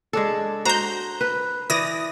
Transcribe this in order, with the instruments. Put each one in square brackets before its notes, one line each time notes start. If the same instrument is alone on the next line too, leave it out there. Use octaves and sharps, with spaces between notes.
[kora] G#3 D4 A4
[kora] F#4 C5 [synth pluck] A#5 G6
[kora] B4
[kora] E3 D5 [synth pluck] D#6 A#6